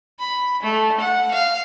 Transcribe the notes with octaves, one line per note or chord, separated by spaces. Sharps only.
B5
A3
F#5
F5